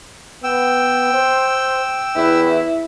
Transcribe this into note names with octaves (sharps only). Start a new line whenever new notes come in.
B3 G5 E6
C5
E2 E4 B4